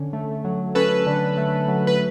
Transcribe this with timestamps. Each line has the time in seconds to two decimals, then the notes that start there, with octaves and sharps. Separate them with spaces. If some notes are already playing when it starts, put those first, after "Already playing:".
Already playing: D3 C#4
0.13 A3
0.45 F#3
0.75 C#4 A4 B4
1.07 D3
1.38 A3
1.68 F#3
1.87 B4